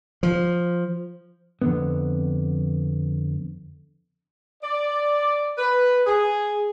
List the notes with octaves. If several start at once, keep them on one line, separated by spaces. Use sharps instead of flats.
F3
F2 D3 B3
D5
B4
G#4